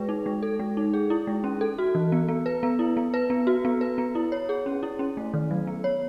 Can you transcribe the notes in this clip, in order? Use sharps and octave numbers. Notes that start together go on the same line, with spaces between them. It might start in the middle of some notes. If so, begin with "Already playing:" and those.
Already playing: G#3 G#4 B4
D#4
G#3
A4
G#3
D#4
G#4
E4
G#3
C#4
A4
F#4
E3
B3
B3
B4
B3
E4
B3
B4
B3
F#4
B3
B4
B3
E4
C#5
G#4
C#4
E4
C#4
A3
D#3
F#3
B3
C#5